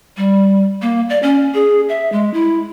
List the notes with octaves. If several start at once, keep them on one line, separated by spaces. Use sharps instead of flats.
G3
A#3
D5
C#4
G#4
E5
G#3
E4